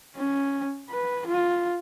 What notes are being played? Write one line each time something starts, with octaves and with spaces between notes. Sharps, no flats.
C#4
B4
F4